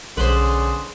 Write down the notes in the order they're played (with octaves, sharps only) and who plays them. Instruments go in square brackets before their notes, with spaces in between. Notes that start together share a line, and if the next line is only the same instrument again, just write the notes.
[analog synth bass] B1 [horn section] D3 C#4 G#4 [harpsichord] B4 C5